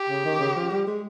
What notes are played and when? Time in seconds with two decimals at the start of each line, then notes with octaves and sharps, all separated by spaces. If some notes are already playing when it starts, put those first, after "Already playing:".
Already playing: G4
0.09 C#3
0.25 D#3
0.40 C#3
0.56 F3
0.71 G3
0.87 G#3